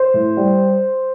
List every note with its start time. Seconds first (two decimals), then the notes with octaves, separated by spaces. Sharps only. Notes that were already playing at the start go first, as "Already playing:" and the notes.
Already playing: C5
0.14 A2
0.37 G3